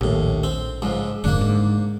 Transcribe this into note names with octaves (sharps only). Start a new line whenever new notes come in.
A#1 D#2 A2
C4
C#2 G#2 F3
F1 G#2 D3 A#3 D4
G#2